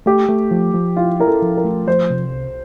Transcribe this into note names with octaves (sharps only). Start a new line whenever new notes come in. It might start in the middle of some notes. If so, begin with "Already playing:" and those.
A3 G4
A3
F3
F3
E4 F4
E4 A#4
A4
F3
A#4
A3
F3 C5
C3
C2